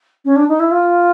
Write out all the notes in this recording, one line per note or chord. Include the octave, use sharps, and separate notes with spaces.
C#4
D4
D#4
E4
F4